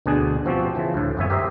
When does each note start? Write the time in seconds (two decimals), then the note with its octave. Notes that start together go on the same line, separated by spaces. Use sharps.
0.06 D2 B2 D4 G#4
0.45 B2 F3 C4 F#4 G4
0.75 C#3 E3 F3
0.94 D2 A2
1.17 G1 F2 B3 C#4 E5 G#5
1.30 G4 A#4 C5 D#5 E5